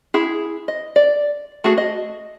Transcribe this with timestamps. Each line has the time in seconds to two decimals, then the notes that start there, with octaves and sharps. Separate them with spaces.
0.14 E4 G#4
0.68 D#5
0.96 D5
1.64 A3 F#4 G#4
1.78 D#5